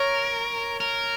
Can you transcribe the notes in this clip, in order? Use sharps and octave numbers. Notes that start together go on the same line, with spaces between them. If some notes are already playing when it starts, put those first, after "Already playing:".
Already playing: A#4 C#5
A#4